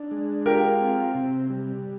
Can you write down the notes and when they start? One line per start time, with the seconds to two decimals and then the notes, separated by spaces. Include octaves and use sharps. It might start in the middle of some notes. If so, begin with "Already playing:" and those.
Already playing: D4
0.11 G#3
0.46 F4 G4 A#4
0.81 C4
1.15 C3
1.50 G3